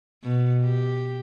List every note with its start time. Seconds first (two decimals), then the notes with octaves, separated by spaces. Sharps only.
0.24 B2
0.63 G4